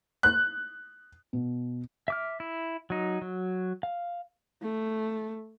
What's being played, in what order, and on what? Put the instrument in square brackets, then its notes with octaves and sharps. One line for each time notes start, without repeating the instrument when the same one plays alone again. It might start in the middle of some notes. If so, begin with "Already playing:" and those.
[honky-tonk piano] F#6
[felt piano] B2
[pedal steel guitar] E5 D6 F6
E4
F#3 D#4
F#3
F5
[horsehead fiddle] A3